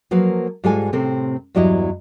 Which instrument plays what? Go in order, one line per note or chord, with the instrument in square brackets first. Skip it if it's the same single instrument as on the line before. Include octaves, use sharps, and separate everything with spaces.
[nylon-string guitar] F3 F#3 A#3 B4
G#2 G3 G#3 F4 A4 G#5
A2 C3 C4 A4
E2 G2 F#3 G3 E4 D#5